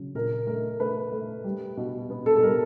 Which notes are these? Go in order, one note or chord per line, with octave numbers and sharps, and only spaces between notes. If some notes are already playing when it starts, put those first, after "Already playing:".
Already playing: C#3 F#3
A#2 A#4
A3 A#4
A3 B4
A3
G3
B2
B3
A4
A4
G3 A#4